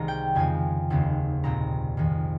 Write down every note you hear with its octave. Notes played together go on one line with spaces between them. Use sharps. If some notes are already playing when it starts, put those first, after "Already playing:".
Already playing: C2 C3 D#3 G#3 C4 A#5
G5
F2 C#3 F3 G#3 C4 G#5
F1 D#2 C#3 G#3 C4
C2 A#2 G#3 C4 A#5
F2 D#3 G#3